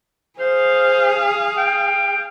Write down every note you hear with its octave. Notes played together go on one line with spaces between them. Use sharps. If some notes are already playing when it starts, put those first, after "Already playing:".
G#4 C5 F5
G5